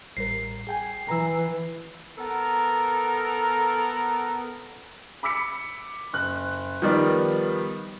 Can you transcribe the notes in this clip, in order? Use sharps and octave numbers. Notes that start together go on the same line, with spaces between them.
A1 G3 A#4 C7
G#4 G5 G#5
E3 A#5 E6
B3 A4 A#4
B5 D6 E6 B6 C#7
F#1 F#6
D#3 F3 G3 B3 B4 D5